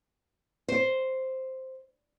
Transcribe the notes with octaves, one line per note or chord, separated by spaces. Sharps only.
C5